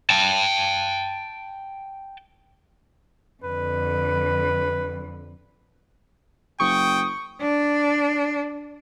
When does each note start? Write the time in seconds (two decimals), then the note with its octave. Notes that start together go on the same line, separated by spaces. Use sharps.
0.10 G5 A5
3.43 F2 D3 B4
6.60 F#1 G5 C#6 D#6
7.41 D4